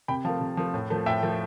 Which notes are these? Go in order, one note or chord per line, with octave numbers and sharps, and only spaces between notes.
C3 G5 B5
F3 A3 F5 A5
C3
F3 A3
A2
F3 A3
A2 E5 G5
F3 A3